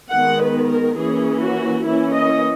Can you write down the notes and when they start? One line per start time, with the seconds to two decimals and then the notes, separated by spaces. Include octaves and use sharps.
0.13 D#3 G#3 B3 F#5
0.42 B4
0.71 A#4
0.99 E3 A#3 C#4 G#4
1.43 F#4
1.86 E3 A#3 C#4 E4
2.15 D#5